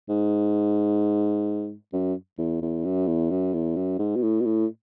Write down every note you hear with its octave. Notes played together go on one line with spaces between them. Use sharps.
G#2
F#2
E2
E2
F#2
E2
F#2
E2
F#2
G#2
B2
A2
B2
A2